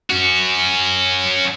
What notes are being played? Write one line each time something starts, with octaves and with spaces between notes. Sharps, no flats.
C#4 F#4